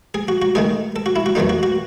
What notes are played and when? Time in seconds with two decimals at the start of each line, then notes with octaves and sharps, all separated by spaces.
0.14 G#4
0.28 F#4
0.42 F#4
0.55 D#3 A3 D#4 G#4
0.96 A4
1.06 F#4
1.16 E4
1.26 F#4
1.35 E2 D#3 F#3 A3 D#4
1.49 F#4
1.63 F#4